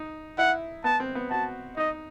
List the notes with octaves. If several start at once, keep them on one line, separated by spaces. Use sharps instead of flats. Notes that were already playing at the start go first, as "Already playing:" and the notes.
Already playing: D#4
E4 F#5
B3 A5
C4
B3
F#4 A5
D#4 D#5